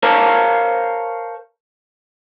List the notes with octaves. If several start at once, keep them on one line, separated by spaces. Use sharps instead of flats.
A#4 C5 C#5 F5 A5 A#5